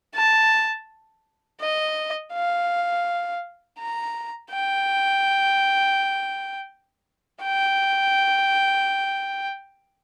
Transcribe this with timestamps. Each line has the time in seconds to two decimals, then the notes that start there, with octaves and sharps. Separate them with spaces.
0.15 A5
1.61 D#5
2.33 F5
3.79 A#5
4.52 G5
7.43 G5